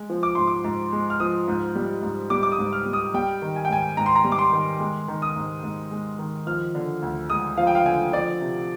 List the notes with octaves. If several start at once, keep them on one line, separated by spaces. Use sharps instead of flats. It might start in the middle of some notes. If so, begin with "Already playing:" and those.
Already playing: G#3
F3
D6
G#2 C6
D6
G#2
G#3
F6
F3 D#6
G#2
G3
G#2
G3 D6
D6
D#6
G#2
F6
G3
D#6
G3 G5
D#3
G#5
G5
G#2 G#5
G#2 A#5
C6
A#5
G3
D6
C6
D#3
G#3
D#3
D#6
G#2
G#2
G#3
D#3
F3 F6
D3
D2
G#3 D#6
F3 F5
G5
F5
D3 G#5
F3 D5
C3